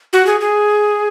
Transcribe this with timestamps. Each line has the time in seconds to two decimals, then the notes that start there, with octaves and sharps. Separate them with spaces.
0.13 F#4
0.27 G#4
0.40 G#4